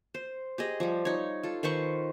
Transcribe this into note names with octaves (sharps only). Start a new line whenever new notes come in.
C5
G4 G#4 D#5
F3 G3
D#4 C#5
F4 A4
D#3 B4 C5 C#6